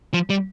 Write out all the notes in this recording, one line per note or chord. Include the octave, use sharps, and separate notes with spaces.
F3
G3